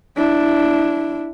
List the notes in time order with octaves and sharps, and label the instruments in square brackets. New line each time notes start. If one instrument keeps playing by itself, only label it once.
[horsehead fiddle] D4 E4